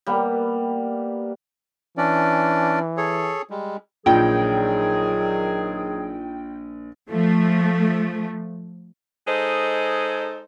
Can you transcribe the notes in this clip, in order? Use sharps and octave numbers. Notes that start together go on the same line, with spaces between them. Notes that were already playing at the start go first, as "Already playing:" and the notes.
G3 A#3 B3
E3 C#4 D4 D5
G#4 A4 C#5
G3 G#3
A#1 D#3 F#3 D#4 F4 G#4 D5 G5
F3 A3
G#3 D#4 G#4 A4 C5 D#5